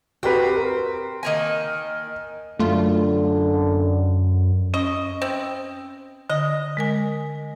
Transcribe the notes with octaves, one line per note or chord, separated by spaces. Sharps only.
C4 F#4 G4 B4
A#4
D#3 A#3 G#5
F#2 D3 A3 F4
C#4 D#5
C4
D3 D#5
G#3 A#4 G#5